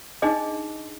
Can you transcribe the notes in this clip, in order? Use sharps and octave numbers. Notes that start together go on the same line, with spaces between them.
D4 D#4 G#4 D#5 D6